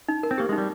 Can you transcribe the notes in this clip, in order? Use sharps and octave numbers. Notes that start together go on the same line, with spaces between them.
D#4
A#4
C4
A#3 G4
G#3
D#4
G3